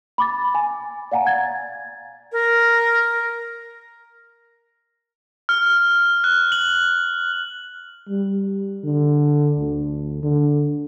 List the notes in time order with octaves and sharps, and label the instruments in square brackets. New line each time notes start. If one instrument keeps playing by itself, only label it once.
[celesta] B5 D6 A6
G#5
D5 F5 F#5 G#5 A#5
F#5 G#6 A6
[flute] A#4
[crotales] F6
F#6
F#7
[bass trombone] G3
D3
D2
D3